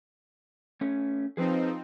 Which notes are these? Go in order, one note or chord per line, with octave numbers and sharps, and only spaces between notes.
A3 C#4 C#5
F3 C4 D#4 G#4 B4 C5